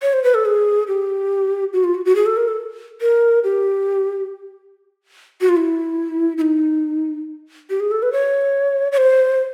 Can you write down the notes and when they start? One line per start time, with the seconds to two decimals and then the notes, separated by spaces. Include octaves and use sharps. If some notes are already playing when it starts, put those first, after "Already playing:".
0.02 C#5
0.13 C5
0.24 B4
0.34 A4
0.45 G#4
0.88 G4
1.73 F#4
1.84 F4
1.95 F#4
2.05 F#4
2.15 G#4
2.26 A4
2.37 A#4
2.48 A4
3.01 A#4
3.44 G4
5.41 F#4
5.49 F4
5.56 E4
6.37 E4
6.41 D#4
7.70 G4
7.80 G#4
7.91 A4
8.02 B4
8.12 C#5
8.92 C#5
8.97 C5